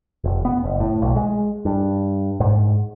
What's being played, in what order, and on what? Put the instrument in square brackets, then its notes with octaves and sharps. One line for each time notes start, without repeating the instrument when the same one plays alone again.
[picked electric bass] F1
B3
F#1
A2
B1
G#3
G2
G#2